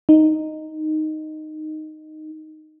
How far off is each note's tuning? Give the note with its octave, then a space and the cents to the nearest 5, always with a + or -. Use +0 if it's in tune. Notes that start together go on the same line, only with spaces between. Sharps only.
D#4 -5